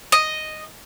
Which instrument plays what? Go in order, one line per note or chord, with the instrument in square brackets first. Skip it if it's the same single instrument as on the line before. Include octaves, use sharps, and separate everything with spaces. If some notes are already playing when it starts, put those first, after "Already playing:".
[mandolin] D#5